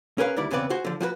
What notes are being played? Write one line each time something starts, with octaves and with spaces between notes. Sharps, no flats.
C#4 G#4 A#4 B4 C#5 F5
D2 D#3 G3 E4 D5
E2 C#3 B3 C4 B4 D5
F#4 G#4 C5
D3 F3
F3 F#4 G4 B4